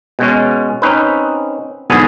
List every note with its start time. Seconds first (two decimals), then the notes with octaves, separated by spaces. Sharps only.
0.19 B2 G#3 C#4
0.82 C4 C#4 D#4 B4
1.90 B1 E2 G#2 D3 B3 G#4